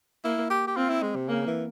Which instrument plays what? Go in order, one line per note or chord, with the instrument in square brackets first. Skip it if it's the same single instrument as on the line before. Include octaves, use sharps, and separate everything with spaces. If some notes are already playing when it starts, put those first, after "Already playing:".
[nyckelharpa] A#3 [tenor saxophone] E4
[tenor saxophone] G4
G4
[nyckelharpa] C4 [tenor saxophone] F4
[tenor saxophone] E4
G#3
C3
[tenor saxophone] C#3 [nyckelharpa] A#3
[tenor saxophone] E3